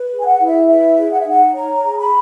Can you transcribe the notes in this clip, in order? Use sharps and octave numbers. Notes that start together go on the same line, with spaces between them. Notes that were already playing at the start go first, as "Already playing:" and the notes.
Already playing: B4
G#4
G#5
F#5
E4
E5
B4 E5
G#4
F#5
E5
D#4 F#5
C#5 A#5
G#4
B5